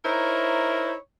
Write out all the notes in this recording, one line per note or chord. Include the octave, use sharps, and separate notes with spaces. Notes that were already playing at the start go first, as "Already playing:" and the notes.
D#4 E4 A#4 C5 C#5